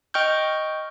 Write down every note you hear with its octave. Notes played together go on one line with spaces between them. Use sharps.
D#5 G5 C#6 F6 G6